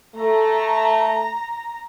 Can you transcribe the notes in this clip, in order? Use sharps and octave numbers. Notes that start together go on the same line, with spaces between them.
A3 A#5